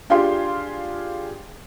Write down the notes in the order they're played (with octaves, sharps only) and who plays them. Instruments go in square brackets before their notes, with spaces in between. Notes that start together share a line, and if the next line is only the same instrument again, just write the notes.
[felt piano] D4 F4 G4 G#4 F5 C6